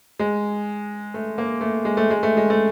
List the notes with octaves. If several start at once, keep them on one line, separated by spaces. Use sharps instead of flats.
G#3
A3
A#3
A3
G#3
A3
G#3
A3
G#3
A3